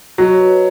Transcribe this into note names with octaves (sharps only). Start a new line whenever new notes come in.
F#3 D#5
C#5
B4
C#5